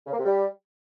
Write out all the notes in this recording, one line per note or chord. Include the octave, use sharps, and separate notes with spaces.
C#3
A#3
C3
G3